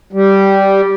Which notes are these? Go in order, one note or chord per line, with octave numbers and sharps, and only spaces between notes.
G3